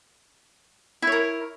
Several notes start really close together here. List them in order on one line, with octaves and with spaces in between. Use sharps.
E4 C#5 A#4